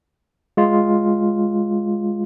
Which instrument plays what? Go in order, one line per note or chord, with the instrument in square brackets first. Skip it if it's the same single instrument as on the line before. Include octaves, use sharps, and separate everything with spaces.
[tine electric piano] G#3 F4